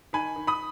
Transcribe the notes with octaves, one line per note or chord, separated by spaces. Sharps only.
D#3 G#5 B5
D#3
B5 D#6